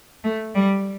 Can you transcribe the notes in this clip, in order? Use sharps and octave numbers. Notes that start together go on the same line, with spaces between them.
A3
G3